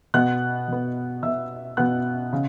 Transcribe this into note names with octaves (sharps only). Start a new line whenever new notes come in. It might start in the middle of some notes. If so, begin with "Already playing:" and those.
B2 B3 F#5 F#6
B2 B3
B2 B3 E5 E6
B2 B3 F#5 F#6
C#3